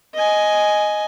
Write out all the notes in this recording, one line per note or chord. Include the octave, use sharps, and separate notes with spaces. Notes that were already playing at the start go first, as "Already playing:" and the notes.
D#5 G#5